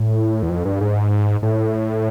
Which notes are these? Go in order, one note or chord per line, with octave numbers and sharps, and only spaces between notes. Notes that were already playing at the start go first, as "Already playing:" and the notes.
Already playing: A2
E2
F2
G2
G#2
A2